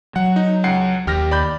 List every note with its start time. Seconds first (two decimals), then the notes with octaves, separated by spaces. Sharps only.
0.16 F#3 F#5
0.36 D#4
0.64 C#2 F#5 C7
1.07 D#2 G4 F6 A#6
1.31 D5 B5 G6